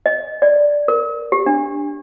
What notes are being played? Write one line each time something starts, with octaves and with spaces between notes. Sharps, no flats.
D#5
D5
A#4
G4
D4